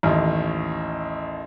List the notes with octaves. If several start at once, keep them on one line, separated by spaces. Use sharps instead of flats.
A1 D#2